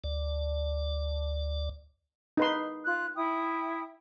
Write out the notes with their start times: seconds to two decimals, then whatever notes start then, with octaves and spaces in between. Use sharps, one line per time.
0.04 D2 D5
2.37 D#4 B4 C6
2.86 F4 F#6
3.16 E4 G5 D#6